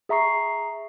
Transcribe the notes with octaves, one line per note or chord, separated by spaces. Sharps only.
G#4 E5 A#5 C#6 C7